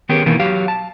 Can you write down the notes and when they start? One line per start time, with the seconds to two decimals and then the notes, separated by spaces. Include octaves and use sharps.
0.09 D#3 B3 C#4 G4 G#4 A#4
0.26 B2 D#3 E3 A#3
0.40 F#3 G4 F5
0.68 A5